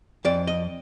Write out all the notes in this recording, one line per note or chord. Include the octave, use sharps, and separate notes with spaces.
F2 D5
D#5